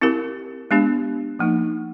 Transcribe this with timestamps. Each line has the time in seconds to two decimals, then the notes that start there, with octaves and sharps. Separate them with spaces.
0.01 C4 E4 G4 A#4
0.71 G#3 B3 D4 G4
1.39 F3 A#3 D#4